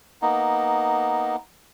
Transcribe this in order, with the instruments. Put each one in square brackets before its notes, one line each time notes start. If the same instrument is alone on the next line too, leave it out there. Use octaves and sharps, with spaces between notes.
[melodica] A#3 B3 D#4